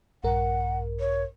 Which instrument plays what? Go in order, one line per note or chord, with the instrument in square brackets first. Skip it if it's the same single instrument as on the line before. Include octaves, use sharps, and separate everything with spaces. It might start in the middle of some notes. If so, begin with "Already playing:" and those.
[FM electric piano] A#1 G2 A#4 [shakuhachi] F#5
[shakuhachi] C#5